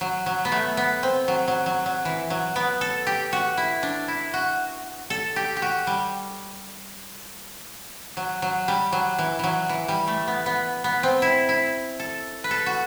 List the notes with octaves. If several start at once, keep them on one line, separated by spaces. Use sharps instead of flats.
F#3
F#3
B3
A3
B3
C4
F#3
F#3
F#3
F#3
E3
F#3
B3
A4
G4
F#4
E4
D4
E4
F#4
A4
G4
G4
F#4
G3
F#3
F#3
G3
F#3
E3
E3 F#3
E3
G3
A3
B3
B3
B3
C4
E4
E4
A4
B4
A4
F#4